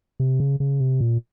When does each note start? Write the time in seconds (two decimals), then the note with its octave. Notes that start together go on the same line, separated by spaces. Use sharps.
0.20 C3
0.40 C#3
0.60 C#3
0.80 C3
1.01 A#2